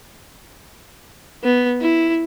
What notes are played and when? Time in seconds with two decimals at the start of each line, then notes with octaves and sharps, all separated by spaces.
1.44 B3
1.81 E4